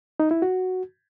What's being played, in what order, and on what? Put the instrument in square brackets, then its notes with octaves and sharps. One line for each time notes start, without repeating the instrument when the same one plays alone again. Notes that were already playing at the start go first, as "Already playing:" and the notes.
[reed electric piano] D#4
E4
F#4